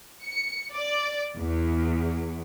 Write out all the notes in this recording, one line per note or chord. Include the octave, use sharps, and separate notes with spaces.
C#7
D5
E2